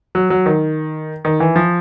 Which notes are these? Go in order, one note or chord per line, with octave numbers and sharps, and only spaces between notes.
F#3
F#3
D#3
D#3
E3
F3